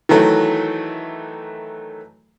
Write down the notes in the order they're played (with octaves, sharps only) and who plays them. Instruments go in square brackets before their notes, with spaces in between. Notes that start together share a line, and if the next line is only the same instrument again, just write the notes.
[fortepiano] D#3 E3 F#3 A3